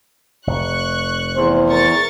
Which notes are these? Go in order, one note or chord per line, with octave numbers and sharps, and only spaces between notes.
F1 C#6 F#6
E2 C5
A#4 C#6 A6